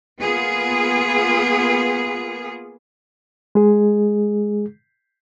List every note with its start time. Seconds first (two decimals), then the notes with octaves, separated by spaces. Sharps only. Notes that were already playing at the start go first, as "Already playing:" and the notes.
0.20 A#3 B3 F4 G#4
3.55 G#3 G#4